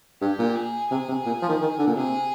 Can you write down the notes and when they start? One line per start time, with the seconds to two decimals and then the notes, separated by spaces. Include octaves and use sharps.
0.22 G2 G4
0.39 A#2
0.56 G#4
0.91 C3 G#4
1.08 C3
1.26 A#2
1.42 F3
1.49 D#3
1.61 D#3
1.78 D3
1.86 A#2
1.95 C3 G#4